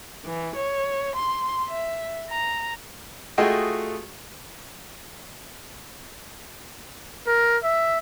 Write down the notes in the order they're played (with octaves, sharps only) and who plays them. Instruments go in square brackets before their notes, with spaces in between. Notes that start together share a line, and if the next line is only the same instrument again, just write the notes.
[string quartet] E3
C#5
C6
E5
A#5
[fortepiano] A3 F4 F#4 G#4 D#5 G5
[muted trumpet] A#4
E5